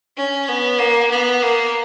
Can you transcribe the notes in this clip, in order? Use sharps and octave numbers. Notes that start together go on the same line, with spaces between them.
C#4
B3
A#3
B3
A#3